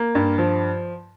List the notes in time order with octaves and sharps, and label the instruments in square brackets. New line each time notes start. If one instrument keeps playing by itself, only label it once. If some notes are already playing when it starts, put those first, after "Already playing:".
Already playing: [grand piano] A#3
G2
F3